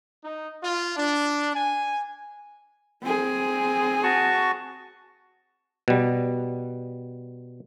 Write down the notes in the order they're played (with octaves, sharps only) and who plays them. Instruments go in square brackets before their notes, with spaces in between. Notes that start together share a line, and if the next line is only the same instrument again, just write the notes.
[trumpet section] D#4
F4
D4
G#5
[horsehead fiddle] C4 G#4
[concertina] F#4 A5 C#6
[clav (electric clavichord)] B2 G3